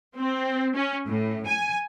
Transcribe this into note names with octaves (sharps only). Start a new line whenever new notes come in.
C4
C#4
A2
G#5